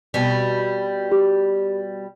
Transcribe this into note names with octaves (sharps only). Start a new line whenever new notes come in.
B2 G3
G4